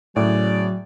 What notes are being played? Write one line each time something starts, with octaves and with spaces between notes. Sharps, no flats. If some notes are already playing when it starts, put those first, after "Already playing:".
A2 C#3 F#3 D5